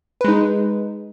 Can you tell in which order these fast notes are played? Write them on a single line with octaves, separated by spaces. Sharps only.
B4 G#3 D#4